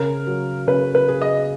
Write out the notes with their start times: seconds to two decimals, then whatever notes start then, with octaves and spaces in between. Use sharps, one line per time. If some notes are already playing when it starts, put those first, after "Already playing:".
Already playing: C#3 A#4
0.27 F#3
0.67 C#3 B4
0.95 B4
1.08 G#4
1.22 D#5